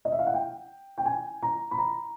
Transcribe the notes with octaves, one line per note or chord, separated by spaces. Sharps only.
D#5
E5
F5
F#5
G5
G5
G#5
A#5
B5
A#5